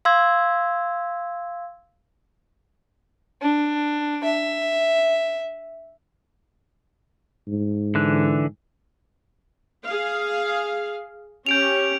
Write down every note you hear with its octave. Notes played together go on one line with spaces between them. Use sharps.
F5 C6 E6 G#6
D4
E5
G#2
D3 E3 F#6
G#4 F5
C#4 G4 C#5 G6 D7 F7